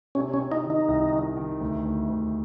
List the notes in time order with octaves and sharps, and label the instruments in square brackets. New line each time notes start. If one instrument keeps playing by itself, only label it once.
[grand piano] C3 [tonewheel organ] C#4
[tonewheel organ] C#4
[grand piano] C3
[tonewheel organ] D#4
[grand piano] D#3
[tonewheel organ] D#4
[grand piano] C2
D#3
D#3
D2
D2
D2